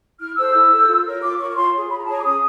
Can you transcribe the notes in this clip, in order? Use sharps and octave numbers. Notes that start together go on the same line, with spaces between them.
E4 F6
A4 C5 E6
E4
A4 C5
F4
A#4 C#5
F4 D6
A#4 C#5 C#6
C#6
F4 C6
G#4 C#5
F4 B5
A#5
A5
G#4 C#5 A#5
D6
C#4 D#6